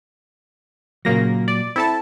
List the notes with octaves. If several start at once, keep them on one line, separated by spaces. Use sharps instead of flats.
A#2 C#3 F#3 A#3 A#6
D5
C4 E4 A4 A5